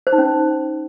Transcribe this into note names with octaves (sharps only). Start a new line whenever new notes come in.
C5
D#4
C#4